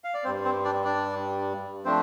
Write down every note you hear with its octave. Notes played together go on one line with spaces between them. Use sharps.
F5
D5
G2 G3 C4 C5
C4 C5
D4 D5
D4 D5
F3 A3 C4 D4 C5